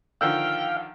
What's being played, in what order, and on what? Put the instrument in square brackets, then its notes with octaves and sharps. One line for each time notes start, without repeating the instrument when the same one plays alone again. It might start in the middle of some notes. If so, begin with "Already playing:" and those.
[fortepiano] D3 D#3 F3 [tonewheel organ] F5 [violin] G5 [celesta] E6 G6